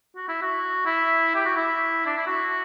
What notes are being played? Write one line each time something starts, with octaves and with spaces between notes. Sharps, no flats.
F#4
E4
F#4
E4
G4
F#4
E4
D4
E4
F#4